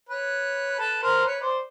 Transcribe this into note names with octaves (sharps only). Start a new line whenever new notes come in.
B4 C#5
A4 B4
A#4 C5
B4 C#5
C5 D5